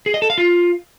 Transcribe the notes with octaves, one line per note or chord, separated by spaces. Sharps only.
G#4
D#5
A4
F5
F4